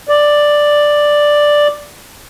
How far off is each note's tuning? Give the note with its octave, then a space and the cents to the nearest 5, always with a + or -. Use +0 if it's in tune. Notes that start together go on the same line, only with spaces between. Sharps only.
D5 +5